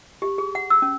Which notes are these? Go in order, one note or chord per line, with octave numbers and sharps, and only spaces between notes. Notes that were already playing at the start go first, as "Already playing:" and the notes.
G4
G#4
F#5
E6
C#4